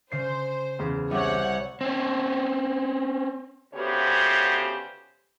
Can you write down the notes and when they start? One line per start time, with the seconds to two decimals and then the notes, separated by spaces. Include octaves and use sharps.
0.12 C#3 C5 C7
0.79 E2 C#3
1.11 C2 G4 C#5 F#5
1.81 C4 C#4
3.74 D2 C#3 B3 G4 C5 C#5